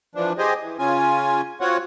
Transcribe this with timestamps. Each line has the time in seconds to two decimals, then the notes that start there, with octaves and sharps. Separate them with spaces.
0.15 E3 F3 D4
0.38 G4 G#4 C5 D#5
0.61 E3
0.79 C#3 C#4 F4 G#5
1.61 C4 F4 F#4 C#5 F#5